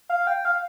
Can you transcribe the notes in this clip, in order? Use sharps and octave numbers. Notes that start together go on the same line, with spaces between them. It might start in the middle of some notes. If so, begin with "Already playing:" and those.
F5
G5
F5